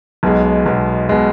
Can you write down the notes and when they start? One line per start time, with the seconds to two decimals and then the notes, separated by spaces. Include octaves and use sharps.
0.23 B1 B2 G#3
0.66 B1 B2 G#3
1.09 B2 G#3